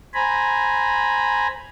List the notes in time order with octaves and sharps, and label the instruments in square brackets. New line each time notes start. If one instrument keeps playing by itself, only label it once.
[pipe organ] C5 G#5 A#5 B5